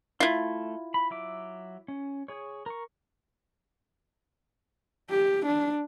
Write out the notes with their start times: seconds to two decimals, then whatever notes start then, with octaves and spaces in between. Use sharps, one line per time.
0.20 A3 E4 F4
0.94 B5
1.10 F#3 E5 D6
1.88 C#4
2.28 G#4 C#5
2.66 A#4 C#6
5.10 G4
5.46 D4